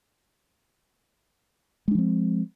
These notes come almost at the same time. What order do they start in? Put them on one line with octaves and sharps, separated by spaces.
G#3 D4 F3 C4